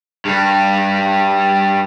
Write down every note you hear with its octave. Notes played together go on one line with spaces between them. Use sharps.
G2 G3